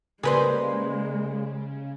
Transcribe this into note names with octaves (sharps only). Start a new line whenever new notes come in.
C#3 G3 G#3 A#3 G#4 B4 C5